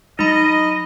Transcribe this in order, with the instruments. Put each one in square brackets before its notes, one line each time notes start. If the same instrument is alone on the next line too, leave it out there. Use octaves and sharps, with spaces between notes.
[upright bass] F#3 [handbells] D#4 B5 [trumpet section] D#5